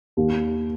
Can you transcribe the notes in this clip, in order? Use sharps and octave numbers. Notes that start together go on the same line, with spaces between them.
D#2